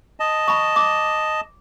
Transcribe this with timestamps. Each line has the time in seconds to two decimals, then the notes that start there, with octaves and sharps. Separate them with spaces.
0.20 D#5 A5
0.48 B5 C#6
0.76 D6